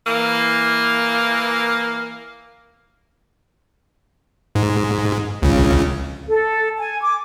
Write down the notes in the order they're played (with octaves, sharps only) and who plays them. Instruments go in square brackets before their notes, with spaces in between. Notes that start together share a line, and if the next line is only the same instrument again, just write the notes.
[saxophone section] E3 A#3
[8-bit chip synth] G#2
C#2 C#3
[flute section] A4
G#5
D6